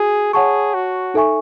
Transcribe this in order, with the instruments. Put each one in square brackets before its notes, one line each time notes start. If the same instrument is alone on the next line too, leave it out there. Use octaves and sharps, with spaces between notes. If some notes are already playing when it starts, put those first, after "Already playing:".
Already playing: [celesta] F#4 [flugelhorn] G#4
[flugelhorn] G#4 [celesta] C#5 F#5 A5 C#6
[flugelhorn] F#4
[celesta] D#4 A4 E5 G#5 C#6